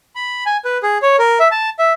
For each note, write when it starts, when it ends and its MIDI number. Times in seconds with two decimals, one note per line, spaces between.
0.16 0.44 83
0.46 0.57 80
0.65 0.78 71
0.83 0.98 68
1.02 1.16 73
1.19 1.39 70
1.40 1.48 76
1.51 1.70 81
1.79 1.93 76